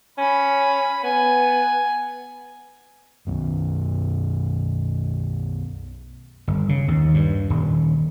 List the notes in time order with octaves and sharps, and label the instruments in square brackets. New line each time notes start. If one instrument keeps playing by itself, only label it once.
[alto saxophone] C#4 [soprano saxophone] B5
[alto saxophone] B3 [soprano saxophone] G#5
[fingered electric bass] B1 F#2
[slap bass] G1
C#3
D#2
G2
D#1